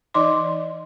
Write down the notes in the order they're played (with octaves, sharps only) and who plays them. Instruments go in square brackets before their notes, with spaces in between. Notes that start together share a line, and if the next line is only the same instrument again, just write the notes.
[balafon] E3 D#4 D5 D#5 C6 D6